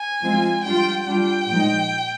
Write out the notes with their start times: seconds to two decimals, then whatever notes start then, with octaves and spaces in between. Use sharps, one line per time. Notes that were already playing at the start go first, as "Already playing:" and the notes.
Already playing: G#5
0.22 F3 G#3 C4 F4
0.64 G3 D4 F4 G5
1.06 G3 D4 F4 G5
1.49 A#2 F3 G#3 D#4